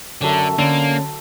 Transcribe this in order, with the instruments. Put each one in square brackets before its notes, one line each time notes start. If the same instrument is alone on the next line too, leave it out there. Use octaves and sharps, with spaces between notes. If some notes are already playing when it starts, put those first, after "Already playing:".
[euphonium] F#2 [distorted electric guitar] D3 [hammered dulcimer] F#3 A4 E5
[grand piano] D3 [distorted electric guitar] A#3 [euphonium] C#4